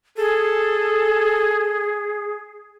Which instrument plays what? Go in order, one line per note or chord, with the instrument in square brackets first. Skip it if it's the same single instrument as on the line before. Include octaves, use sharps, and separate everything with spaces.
[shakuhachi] G#4 [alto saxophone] A4